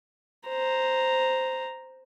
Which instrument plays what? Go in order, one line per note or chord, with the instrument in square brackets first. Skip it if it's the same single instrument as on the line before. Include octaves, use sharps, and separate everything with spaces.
[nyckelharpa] C5 A#5